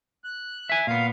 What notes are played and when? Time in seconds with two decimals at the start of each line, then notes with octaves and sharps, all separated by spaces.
0.24 F#6
0.69 E5 G#5
0.87 A#2 B3 F5